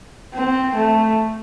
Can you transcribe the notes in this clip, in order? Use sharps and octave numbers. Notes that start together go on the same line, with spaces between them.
C4
A3